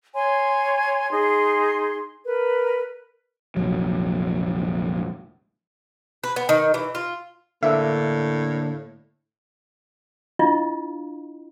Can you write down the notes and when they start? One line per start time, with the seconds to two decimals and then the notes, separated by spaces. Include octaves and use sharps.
0.14 C#5 G#5 C6
1.10 D#4 G#4 C6
2.25 A#4 B4
3.57 F1 A#1 F#3
6.24 B4
6.36 B3
6.49 D#3
6.74 E3
6.95 F4
7.63 A2 D3 A#3 D4 E5
10.39 D4 E4 F4 D#5 F5